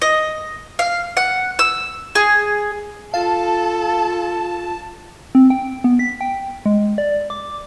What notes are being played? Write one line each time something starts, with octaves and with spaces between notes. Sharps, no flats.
D#5
F5
F#5
E6
G#4
F4 A4 F5 A5
C4
G5
B3
B6
G5
G#3
D5
D6